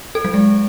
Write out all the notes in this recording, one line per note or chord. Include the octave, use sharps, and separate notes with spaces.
A4
F#3
G#3